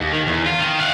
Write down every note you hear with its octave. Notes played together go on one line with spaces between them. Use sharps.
D#2
D#3
E2
F4
D#3
F5 F#5